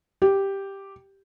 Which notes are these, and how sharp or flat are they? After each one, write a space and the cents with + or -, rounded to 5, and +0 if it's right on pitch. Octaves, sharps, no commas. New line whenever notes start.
G4 +0